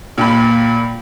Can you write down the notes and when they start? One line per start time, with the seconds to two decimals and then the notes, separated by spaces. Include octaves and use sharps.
0.18 A#2 G5 B5